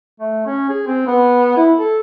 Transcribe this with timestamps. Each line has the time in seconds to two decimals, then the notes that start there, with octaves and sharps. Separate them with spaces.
0.20 A3
0.46 C#4
0.69 G#4
0.86 C4
1.07 B3
1.57 E4
1.79 A4